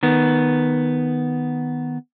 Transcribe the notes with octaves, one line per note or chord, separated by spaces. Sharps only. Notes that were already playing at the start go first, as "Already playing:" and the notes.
D#3 B3